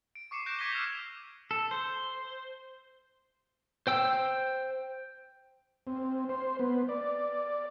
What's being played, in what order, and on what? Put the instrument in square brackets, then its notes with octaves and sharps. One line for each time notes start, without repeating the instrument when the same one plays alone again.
[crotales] D7
C#6 D6 C7 C#7 E7
C#6 F#6 G6 A#6 D7 E7
D6 G#6 A#6 B6 D#7 G7
E6 F6 G6 C7 F7
[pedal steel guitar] A4
C5
C5 G5 E6
[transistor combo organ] C4
C5
B3
D5